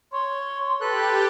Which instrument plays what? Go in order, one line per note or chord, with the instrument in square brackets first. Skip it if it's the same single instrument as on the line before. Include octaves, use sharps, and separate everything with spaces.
[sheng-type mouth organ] C#5 [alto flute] C6
[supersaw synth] G4 [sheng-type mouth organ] A4 B4 F#6